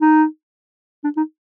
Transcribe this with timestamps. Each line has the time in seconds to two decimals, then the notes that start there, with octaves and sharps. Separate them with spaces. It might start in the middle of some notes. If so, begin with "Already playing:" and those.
0.01 D#4
1.04 D4
1.17 D#4